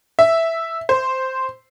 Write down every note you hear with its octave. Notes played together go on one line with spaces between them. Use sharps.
E5
C5